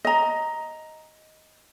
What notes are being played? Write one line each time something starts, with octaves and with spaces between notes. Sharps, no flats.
D#5 A#5